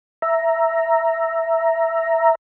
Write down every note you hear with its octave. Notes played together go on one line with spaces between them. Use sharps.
E5 A#5